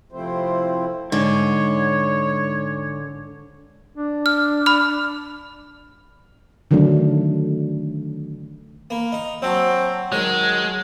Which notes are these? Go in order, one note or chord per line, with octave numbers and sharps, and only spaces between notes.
C3 F3 A3 C4 E4 C5
G#2 D3 C#5
D4
F6
B5 F6
D3 D#3 F#3 A3 D4
A#3 B5
D#4
F#3 C4 F#5 A5 C#6
D#3 F#3 G#3